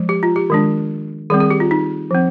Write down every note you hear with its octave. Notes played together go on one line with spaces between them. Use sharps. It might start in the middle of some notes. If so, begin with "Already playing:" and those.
Already playing: F3 G#3
G4
F4
G4
D#3 G#3 D4
D#3 G3 C4 G#4
G#4
G4
F4
D#4
F3 C4